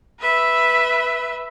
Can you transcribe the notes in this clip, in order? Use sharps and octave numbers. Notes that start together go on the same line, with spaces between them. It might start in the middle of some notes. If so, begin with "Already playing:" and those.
B4 E5